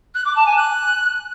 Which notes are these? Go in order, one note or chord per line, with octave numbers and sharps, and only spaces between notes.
F#6
D6
A5
G#5
F#6